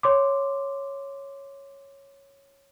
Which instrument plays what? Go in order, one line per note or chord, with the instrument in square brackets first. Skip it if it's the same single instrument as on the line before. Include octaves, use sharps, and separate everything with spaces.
[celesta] C#5 C6 D6